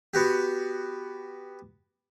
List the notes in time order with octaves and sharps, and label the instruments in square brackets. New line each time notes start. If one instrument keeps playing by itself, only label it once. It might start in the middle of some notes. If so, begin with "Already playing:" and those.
[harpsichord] B3 F#4 G4